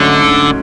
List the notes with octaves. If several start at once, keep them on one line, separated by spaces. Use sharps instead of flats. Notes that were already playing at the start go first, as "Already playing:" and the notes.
Already playing: G#2 D3 F#3 A3 C#4
G#2